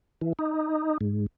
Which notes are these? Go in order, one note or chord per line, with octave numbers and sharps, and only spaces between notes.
E3
D#4
G#2